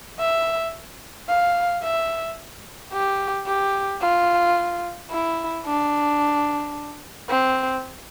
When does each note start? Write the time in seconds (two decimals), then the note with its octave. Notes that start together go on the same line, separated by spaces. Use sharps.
0.19 E5
1.29 F5
1.83 E5
2.93 G4
3.47 G4
4.01 F4
5.10 E4
5.66 D4
7.29 C4